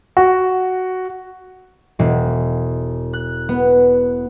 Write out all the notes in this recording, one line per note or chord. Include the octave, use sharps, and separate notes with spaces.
F#4
E1
F#6
B3